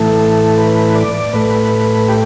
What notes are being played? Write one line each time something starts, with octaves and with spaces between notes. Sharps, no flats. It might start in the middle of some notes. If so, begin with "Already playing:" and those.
Already playing: A2 E3 A3 A4
B4
D5
A2 A3 B4
G4